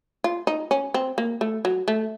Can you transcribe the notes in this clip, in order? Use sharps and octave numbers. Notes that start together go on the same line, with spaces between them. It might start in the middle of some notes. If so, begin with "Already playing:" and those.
F4
D#4
C#4
C4
A#3
A3
F#3
A3